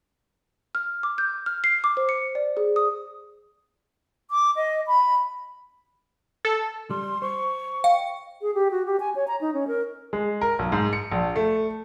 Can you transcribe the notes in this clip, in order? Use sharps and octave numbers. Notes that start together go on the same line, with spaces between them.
F6
D6
G6
F6
C7
D6
C5
C#7
D5
G#4
D#6
D6
D#5
B5
A4
G3 C6
C5 C#6
D#5 F5 G5
G#4
G4
F#4
G4
G#5
C#5
A#5
D#4
C#4
A#4
G#3
A#4
B1
G#2
C#7
A#1
A3